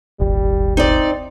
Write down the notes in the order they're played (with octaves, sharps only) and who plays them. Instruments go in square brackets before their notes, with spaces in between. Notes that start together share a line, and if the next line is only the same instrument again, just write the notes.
[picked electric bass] D#1 G#1 [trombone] G3
[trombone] C4 [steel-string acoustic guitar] D#4 D5